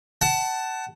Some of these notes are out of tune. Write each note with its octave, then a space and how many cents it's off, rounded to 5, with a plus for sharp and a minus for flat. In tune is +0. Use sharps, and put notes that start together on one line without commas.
F#5 +25 A5 +0